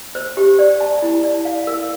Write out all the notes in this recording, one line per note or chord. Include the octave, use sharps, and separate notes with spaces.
C5
G4
D5
A5
E4
D5
F5
A#4